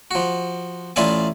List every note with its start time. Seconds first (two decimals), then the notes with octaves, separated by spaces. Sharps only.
0.11 F3 F#4
0.96 A1 F4 D5 E5 G#5